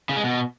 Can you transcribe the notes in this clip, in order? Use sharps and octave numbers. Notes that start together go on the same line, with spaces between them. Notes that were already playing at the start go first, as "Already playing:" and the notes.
C#3
G#3
B2